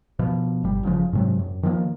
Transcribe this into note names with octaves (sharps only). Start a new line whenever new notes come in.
B2 F3
G1 G3
F#1 C#3 F3
G#2 C3 F#3
F#2
D#3 F3 G#3 A#3